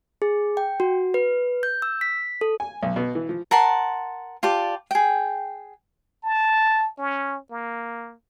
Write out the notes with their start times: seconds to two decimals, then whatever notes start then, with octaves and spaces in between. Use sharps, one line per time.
0.22 G#4
0.57 G5
0.80 F#4
1.14 B4
1.63 G6
1.82 E6
2.01 B6
2.41 A4
2.60 G#5
2.83 B1
2.96 B2
3.15 E3
3.29 F3
3.51 A#4 F#5 A5 C6
4.43 F4 G4 D5 A5
4.91 G#4 G5
6.23 A5
6.98 C#4
7.51 A#3